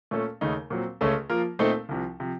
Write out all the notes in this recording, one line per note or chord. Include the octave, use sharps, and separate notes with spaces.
A#2 A3 C#4 A4
D#2 C#3 A3 D#4
A#2 F#3 C4
C#2 C#3 A3 C#4 A4
F3 A#3 F4 A#4
A#2 A3 C4 D#4 A4
C2 C3 F3
C3 F3